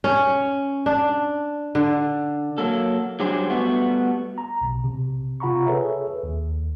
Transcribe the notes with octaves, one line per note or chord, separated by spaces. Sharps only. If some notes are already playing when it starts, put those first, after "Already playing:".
C#4
D4
D3
F#3 A#3 A4
F#3 G3 D4 G4 G#4 C5
G3 A3 B3 F#4
A#5
B1 B2
C3
C3 F4 F#5 A#5 B5 C#6
G#4 A4 B4 C#5 E5
D#2